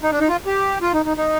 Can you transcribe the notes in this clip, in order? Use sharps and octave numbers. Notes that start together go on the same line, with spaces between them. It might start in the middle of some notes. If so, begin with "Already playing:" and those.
D#4
D4
D#4
F4
G4
F4
D#4
D#4
D#4